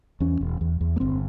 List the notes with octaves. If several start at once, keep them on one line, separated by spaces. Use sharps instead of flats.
E2 C#4
E1
E2
E2
A#3
G1 C4